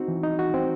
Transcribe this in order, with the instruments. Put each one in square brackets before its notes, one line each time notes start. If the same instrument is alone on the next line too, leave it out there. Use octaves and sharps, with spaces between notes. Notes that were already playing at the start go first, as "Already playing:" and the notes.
Already playing: [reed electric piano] C4 D#4 F#4
E3
D#4
F#4
C4